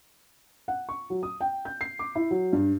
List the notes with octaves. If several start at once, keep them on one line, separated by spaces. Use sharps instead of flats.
F#5
C#6
F#3
D#6
G5
G6
C7
D6
E4
F#3
G2